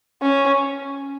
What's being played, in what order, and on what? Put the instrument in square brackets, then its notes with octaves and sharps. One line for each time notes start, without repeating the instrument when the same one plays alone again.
[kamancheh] C#4